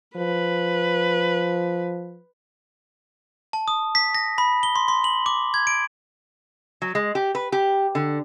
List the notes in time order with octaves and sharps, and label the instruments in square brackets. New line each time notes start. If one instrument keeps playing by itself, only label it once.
[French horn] F3 [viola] B4
[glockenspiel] A5
D#6
B6
A#6
B5
G7
C6
C6
F#7
D6
G#6
D7
[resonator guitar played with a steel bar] F#3
G#3
G4
B4
G4
D3